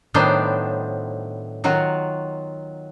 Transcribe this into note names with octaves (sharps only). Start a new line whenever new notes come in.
A2 D#3 F#3 B3 D4 C5
D#3 F#3 F4 F#4